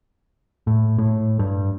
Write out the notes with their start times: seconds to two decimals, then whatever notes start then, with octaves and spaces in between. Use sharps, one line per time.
0.67 A2
0.98 A2
1.39 G2